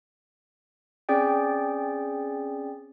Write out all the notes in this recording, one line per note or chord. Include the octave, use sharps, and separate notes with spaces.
C4 C#4 G#4 D5 G5